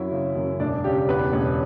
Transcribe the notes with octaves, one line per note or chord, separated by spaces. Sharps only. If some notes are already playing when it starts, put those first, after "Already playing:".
Already playing: F#2 F#3 E4 E5
C#3
F#2
E1 D4 D5
C#3 G4
E2 B3 B4
E1 C#4 C#5